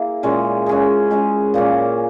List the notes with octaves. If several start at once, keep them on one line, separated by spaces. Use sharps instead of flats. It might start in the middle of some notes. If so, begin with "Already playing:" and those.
Already playing: A#3 E4 G#4
A#2 G#3 C#4
G#3 C#4 G#4
G#3 C#4 G#4
A#2 A#3 C#4